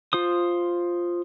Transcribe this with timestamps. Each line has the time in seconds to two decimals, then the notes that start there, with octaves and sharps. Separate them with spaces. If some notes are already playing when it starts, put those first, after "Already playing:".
0.13 F4 C5 D#6